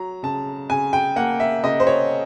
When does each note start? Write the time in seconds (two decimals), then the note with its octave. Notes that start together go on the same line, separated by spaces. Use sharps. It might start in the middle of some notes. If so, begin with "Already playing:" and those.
Already playing: F#3 A#5
0.23 C#3 A5
0.70 C#3 G#5
0.93 G5
1.16 A#3 F#5
1.40 E5
1.63 C#3 D#5
1.80 C5
1.87 C#5